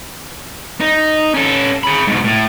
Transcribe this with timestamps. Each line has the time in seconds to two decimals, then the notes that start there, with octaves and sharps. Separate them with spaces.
0.81 D#4
1.34 C#4 A4
1.84 G#4 B5
2.07 G#2 B2
2.24 A2